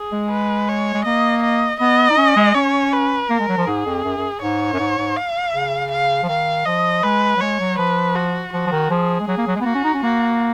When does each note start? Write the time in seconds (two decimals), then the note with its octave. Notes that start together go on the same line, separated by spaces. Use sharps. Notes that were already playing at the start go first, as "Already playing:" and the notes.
Already playing: G#4
0.12 G#3
0.31 B4
0.69 C#5
0.94 G#3
1.05 A#3 D#5
1.43 D#5
1.80 B3 D#5
2.10 D#4
2.17 C#4
2.36 G#3
2.55 C#4 C#5
2.93 B4
3.29 A#3 A#4
3.40 G#3
3.48 F#3
3.58 F3
3.67 G#2 G#4
3.86 F2
4.04 F#2
4.17 F#2
4.42 G#2 C#5
4.73 F#2
4.79 G#2
4.98 G#2
5.16 F5
5.54 C#3
5.91 F5
6.23 F3
6.29 D#3 F5
6.66 F3 D#5
7.03 G#3 B4
7.37 F#3
7.40 G#3 C#5
7.59 F#3
7.78 F3 B4
8.15 F#4
8.53 F3 F#4
8.67 F3
8.72 D#3
8.90 F3 G#4
9.20 G#3
9.28 F#3 G#4
9.37 A#3
9.47 F#3
9.56 G#3
9.61 B3
9.66 A#3 F#4
9.75 C#4
9.84 D#4
9.94 C#4
10.03 A#3 F#4